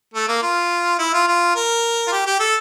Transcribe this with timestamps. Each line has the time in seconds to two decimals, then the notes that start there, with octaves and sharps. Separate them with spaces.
0.14 A3
0.28 A#3
0.43 F4
0.99 E4
1.14 F4
1.28 F4
1.56 A#4
2.07 F4
2.12 G4
2.26 G4
2.40 A4